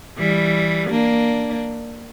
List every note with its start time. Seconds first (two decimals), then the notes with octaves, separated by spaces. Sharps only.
0.18 E3 G3
0.90 A#3 D4